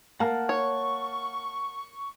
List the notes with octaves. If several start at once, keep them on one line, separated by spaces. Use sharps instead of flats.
A#3 F#5 A5 F6
C#5 C#6